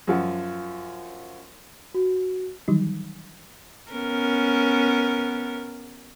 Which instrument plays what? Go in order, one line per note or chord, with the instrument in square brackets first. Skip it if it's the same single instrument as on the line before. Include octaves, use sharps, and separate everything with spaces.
[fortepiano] F#2 F3 F#5
[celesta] F#4
[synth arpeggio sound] D#3 E3 F#3 G3 D#4
[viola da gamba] B3 C#4 A#4